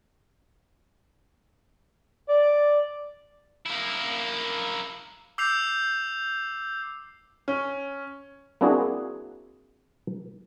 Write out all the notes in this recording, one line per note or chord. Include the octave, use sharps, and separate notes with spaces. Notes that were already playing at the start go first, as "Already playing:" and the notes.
D5
A#3 E4
D6 E6 G6 C7 F7
C#4
A#3 C4 D4 E4 F#4 G#4